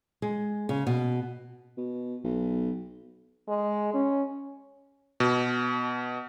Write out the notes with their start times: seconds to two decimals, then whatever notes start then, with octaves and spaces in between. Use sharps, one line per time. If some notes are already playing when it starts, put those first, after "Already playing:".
0.22 G#3
0.69 C#3
0.87 B2
1.77 B2
2.24 B1
3.48 G#3
3.94 C#4
5.20 B2